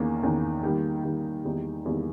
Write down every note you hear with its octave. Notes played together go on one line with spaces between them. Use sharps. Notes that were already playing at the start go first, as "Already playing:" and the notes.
Already playing: E2 D#3 A#3 C#4
E2 D#3 A#3 C#4
D#3 G3 A#3
D#3 G3 A#3
E2 D#3 G3 A#3 D#4
E2 D#3 G3 A#3 D#4